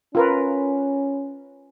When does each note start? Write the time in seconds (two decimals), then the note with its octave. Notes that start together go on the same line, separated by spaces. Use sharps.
0.15 C#4 F4 A#4 B4